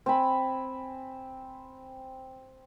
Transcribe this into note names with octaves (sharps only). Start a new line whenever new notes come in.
C4 G#5 B5